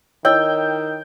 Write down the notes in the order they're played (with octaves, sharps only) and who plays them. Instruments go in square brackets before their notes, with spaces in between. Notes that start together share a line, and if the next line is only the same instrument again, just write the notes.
[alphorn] D#3 [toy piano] E4 C#5 [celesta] D#5 E6 [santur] G5